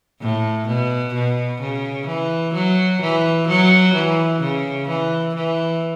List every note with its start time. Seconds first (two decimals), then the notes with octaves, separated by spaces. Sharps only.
0.21 A2
0.67 B2
1.14 B2
1.61 C#3
2.07 E3
2.54 F#3
3.01 E3
3.47 F#3
3.94 E3
4.41 C#3
4.88 E3
5.34 E3